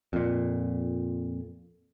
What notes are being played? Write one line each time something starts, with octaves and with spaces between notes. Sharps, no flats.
F2 A#2